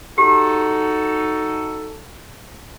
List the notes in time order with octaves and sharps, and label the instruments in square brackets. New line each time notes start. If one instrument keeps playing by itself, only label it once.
[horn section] D#4 F#4 A4 [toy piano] G4